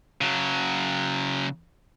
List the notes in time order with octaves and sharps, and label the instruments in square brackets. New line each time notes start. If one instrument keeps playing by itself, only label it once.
[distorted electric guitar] C#3 F#3